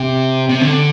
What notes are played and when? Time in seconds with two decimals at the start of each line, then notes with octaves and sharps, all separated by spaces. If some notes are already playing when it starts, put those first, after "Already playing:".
Already playing: C3
0.49 C3
0.61 D3